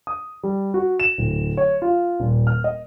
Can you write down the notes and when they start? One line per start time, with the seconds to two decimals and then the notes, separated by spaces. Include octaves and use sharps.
0.07 D#6
0.43 G3
0.74 F#4
1.00 E7
1.18 D1
1.57 C#5
1.82 F4
2.20 D#1
2.47 F6
2.64 D#5